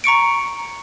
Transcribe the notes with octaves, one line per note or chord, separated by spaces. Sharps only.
A#5 C#6 C#7 D7